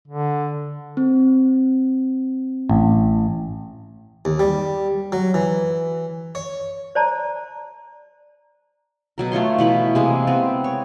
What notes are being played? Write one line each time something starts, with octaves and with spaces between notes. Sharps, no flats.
D3
C4
A1
D#2
G3
F#3
E3
C#5
C5 D5 A5 A#5
B2 F#3 A#4
A3 F4 C#5 C6
B2 E3 B5
C3 G#3 A#3
B3 C4
C#5